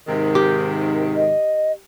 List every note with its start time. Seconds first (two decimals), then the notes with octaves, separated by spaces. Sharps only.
0.07 G#2 C3 D#3
0.35 G4
1.16 D#5